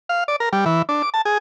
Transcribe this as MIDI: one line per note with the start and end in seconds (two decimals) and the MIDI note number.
0.09 0.24 77
0.28 0.36 74
0.40 0.49 70
0.53 0.65 55
0.66 0.82 52
0.89 1.02 62
1.02 1.10 86
1.14 1.22 81
1.25 1.38 68